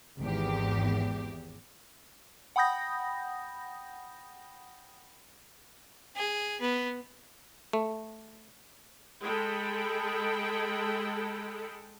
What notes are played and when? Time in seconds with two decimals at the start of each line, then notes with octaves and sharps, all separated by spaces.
0.19 G#1 E2 G4
2.56 F#5 G5 B5 D#6 G6 A#6
6.16 G#4
6.61 B3
7.73 A3
9.22 G#3 G#4 A4 G5 B5